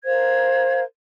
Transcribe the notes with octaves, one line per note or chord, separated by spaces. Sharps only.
A#4 C5 F5 G#6